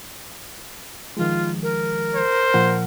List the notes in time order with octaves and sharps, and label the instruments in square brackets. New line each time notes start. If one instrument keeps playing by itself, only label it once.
[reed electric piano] D#3 F3 G#3 [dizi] F4
[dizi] A#4
[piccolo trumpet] C5
[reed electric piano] A#2 F3 F#5